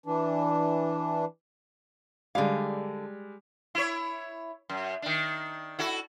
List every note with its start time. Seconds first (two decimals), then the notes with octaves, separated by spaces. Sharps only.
0.06 E3 D4
2.35 D3 G3 G#3 F5
3.75 E4 C#5
4.70 F#2
5.02 D#3 D4
5.79 E4 F#4 A4